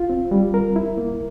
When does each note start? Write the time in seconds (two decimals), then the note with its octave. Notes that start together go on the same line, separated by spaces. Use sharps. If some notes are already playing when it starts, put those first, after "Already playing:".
Already playing: F4
0.10 C4
0.31 G3
0.54 A#4
0.76 E4
0.98 A#3